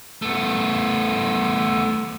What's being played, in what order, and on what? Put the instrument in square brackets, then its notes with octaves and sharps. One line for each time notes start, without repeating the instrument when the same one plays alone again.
[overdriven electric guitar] A3 B3